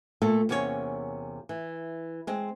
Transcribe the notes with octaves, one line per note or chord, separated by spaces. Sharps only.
A#2 A3 A#3 F4 A4
E2 C3 A#3 C#4 F#4 C#5
E3
G#3 C4